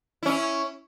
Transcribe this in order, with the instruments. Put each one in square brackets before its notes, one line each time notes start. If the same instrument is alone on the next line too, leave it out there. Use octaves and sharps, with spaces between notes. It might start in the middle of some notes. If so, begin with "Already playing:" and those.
[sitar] C#4 E4